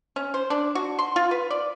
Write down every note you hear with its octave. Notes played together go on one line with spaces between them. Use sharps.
C#4
C5
D4
F#4
C6
F4
B4
D5